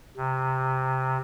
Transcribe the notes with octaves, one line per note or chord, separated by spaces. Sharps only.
C3